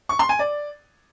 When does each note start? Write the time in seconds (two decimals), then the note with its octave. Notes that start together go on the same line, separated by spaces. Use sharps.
0.09 C#6
0.19 C6
0.29 G#5
0.39 D5